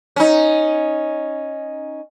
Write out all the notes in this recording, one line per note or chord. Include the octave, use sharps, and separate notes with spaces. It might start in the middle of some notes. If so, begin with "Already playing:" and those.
C#4 D#4